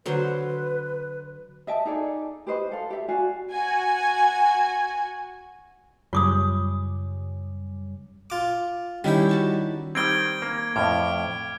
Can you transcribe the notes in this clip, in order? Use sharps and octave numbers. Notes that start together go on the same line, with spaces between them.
D3 F#3 B4 C5
D#5 E5 G5 A5
D#4 G#4 A4 D5
G4 B4 C5 D#5
A4 F5
G4 E5
F#4 D5 F5 G#5
F#4 G#5
F#2 C#3 G3 F4 D6 D#6
F4 D6
D#3 G3 C#4 E4 G4
F#4 A5 C#6
D#3 G3 C4 G#6 D7 G7
A#3
F2 A2 D6 F6